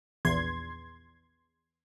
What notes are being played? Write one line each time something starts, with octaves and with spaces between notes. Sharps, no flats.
A#1 E2 C6 G#6